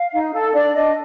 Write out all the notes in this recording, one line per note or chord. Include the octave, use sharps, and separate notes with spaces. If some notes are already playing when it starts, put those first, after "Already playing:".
Already playing: F5
D#4
A4
D4 D5
D4 D#5